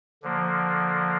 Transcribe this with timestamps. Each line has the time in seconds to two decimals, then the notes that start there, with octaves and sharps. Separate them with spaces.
0.22 D3 F3 A#3